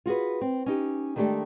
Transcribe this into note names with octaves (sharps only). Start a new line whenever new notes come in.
F4 F#4 G#4 B4
C4
C#4 D#4 G4
D#3 G#3 A3 D4 G4 A4